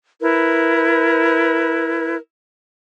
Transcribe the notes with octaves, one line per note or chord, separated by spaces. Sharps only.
E4 A#4 B4